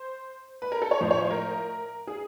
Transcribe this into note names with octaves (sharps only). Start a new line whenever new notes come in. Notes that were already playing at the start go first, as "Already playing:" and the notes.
Already playing: C5
B4
A#4
A4
C#5
A2 F3 C5
C#5
C5
A#4
G#4